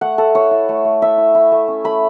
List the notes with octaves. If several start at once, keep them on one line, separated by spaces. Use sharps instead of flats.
A3 F#5
A3 A4
E4 C#5
E4
A3
A3
E4 E5
E4
E4
A3
C#4
A3 B5